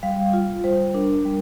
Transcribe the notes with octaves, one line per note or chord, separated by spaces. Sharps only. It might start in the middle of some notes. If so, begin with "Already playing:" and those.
G3 F5
F4
G3 C5
D4 A#4
G3